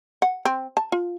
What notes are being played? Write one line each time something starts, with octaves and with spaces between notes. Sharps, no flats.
F#5
C4
A5
F4